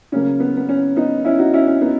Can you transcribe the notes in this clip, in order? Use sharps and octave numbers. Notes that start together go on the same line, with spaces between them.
C#3 F#3 A#3 C#4
B3
B3
C#4
B3 D#4
C#4 E4
D#4 F#4
C#4 E4
C#4
B3 D#4